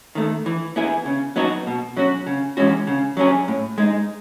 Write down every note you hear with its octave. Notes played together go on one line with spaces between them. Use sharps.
D#3 A3
E3
B3 E4 G#4
C#3
F#3 B3 D#4 F#4
B2
F#3 C#4 F#4
C#3
E3 G#3 C#4 F#4
C#3
F#3 C#4 G#4
A2
G#3 D#4